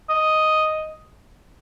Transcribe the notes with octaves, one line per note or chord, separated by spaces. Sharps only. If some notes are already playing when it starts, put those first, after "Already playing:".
D#5